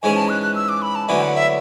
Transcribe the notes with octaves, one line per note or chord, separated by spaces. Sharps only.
G#2 E3 G#3 C#4 G#4 G#5
A5
F#6
F#6
E6
D6
B5
A5
D2 D3 F#3 B3 E4 G#5
F#5
E5